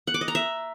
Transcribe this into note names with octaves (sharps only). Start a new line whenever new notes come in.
F#5
D6
D#5
A#5
E5